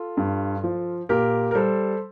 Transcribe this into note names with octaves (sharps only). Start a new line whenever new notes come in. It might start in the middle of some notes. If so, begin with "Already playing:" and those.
Already playing: F4 A4
G2
F3
A#2 G4 A#4
A#4
G3 A4 C5